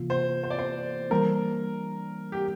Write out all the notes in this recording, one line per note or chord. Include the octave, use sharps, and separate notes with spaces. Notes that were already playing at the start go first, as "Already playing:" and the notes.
Already playing: C3 E3 A#3 F4
C5
C5
D5
C5
E3 G3 A#3 D4 A#4
G4